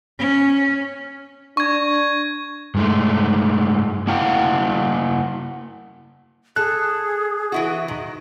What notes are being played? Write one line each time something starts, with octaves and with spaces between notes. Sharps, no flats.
C#4
D4 C#6 G#6
G2 G#3 A3
A#3 E4 F#4 F5 G5
G#4 A4 F#6
E3 E4 F#4
D#3